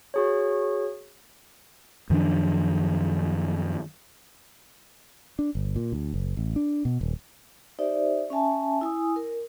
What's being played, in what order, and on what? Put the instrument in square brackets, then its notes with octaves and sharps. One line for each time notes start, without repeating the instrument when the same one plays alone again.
[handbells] F#4 G#4 C#5
[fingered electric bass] F#2 D#3 F3 D4
D4
G1
A#2
D2
F#1
A1
D4
B2
D#1
[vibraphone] D#4 G4 C5 D5 E5
C#4 E5 G#5 A5
E4 G#5 D#6
A#4